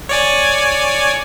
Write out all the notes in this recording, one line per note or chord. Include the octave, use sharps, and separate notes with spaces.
C#5 D5 G#5